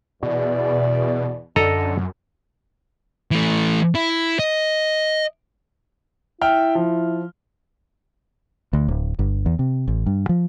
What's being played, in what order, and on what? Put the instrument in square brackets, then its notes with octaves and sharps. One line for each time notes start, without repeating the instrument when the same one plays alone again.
[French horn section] E2 D5 [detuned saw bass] B2
[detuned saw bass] F#2 [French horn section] D3 [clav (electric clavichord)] A4 D#5 A#5
[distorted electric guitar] E3 A3
E4
D#5
[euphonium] E4 [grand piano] E5 G5 F6
[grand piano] F3
[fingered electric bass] D2
D1
G1
E2
C3
A1
G2
F3